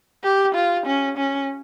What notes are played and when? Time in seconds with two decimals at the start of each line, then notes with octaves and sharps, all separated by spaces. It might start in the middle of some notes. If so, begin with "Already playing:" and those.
0.23 G4
0.55 F4
0.86 C#4
1.17 C#4